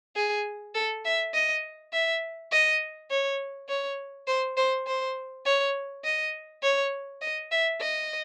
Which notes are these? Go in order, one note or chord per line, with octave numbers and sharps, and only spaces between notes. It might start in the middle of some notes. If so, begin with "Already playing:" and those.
G#4
A4
E5
D#5
E5
D#5
C#5
C#5
C5
C5
C5
C#5
D#5
C#5
D#5
E5
D#5